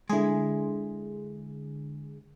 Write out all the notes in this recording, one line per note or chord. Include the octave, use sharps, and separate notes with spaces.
D3 G#3 E4 G#4